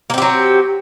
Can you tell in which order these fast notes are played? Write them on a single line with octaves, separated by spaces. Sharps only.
A#3 C4 G4 F#3